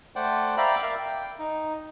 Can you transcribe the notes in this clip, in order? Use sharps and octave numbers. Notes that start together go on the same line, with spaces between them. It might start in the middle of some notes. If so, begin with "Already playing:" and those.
A3 C5 D5 F#5 G5
D5 E5 F5 G5 A#5 B5
A#4 D5 E5 F5
G5
D#4